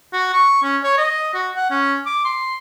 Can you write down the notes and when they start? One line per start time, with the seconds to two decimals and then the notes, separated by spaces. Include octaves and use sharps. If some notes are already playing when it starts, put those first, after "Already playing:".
0.13 F#4
0.34 C#6
0.63 C#4
0.83 C#5
0.98 D#5
1.34 F#4
1.56 F#5
1.70 C#4
2.06 D6
2.25 C6